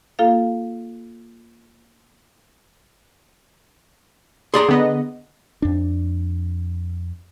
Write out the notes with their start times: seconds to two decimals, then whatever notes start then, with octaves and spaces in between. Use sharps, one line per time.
0.19 A#3 F4 A4 F5
4.54 G#4 D5 A#5 C6
4.68 D3 B3 D#5
5.62 F2 D4